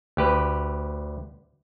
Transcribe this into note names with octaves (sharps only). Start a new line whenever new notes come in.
D2 G4 B4